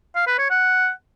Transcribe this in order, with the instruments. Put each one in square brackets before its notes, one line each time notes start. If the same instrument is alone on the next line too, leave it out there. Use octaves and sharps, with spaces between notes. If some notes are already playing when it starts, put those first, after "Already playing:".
[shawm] F5
B4
C#5
F#5